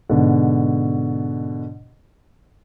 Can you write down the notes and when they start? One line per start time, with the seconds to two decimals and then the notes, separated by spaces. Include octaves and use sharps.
0.09 G#2 B2 D3